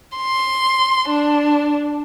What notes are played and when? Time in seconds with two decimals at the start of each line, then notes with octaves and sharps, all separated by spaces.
0.17 C6
1.09 D4